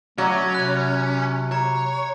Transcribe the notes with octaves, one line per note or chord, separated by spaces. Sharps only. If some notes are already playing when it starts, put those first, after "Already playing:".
F#3 A3 C#4 D6
C3 B5 F#6
C#5 A#5